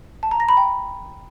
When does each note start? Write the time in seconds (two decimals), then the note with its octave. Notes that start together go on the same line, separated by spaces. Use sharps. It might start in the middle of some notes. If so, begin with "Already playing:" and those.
0.23 A5
0.31 A#5
0.40 A#6
0.49 B5
0.57 G5